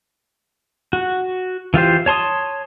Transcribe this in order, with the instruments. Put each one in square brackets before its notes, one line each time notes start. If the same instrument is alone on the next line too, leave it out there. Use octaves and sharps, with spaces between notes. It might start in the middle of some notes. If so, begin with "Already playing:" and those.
[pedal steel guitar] F#4
E3 F4 G4 C5
C#5 A5 C6 D#6